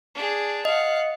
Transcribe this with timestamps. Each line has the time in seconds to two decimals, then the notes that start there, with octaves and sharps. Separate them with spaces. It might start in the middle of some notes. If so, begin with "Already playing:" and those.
0.15 D4 G#4
0.65 D#5 F5 F#5